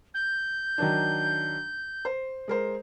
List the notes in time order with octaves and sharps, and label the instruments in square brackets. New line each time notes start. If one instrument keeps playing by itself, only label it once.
[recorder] G6
[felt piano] D#3 F#3 D4
C5
G#3 A#4 C5